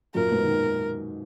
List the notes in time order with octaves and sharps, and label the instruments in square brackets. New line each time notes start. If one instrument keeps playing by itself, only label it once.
[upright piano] F#2 A#2 [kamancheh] A#4
[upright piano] G#2 B2
D#3